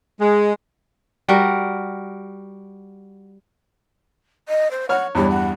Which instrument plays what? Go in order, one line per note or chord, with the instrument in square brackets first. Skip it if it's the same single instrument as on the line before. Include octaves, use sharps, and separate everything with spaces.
[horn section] G#3
[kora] G3 F#4 A#4
[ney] D#5
C5
[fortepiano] C#5 F6 [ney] F#5
[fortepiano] E2 G2 [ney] C#5
[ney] F#5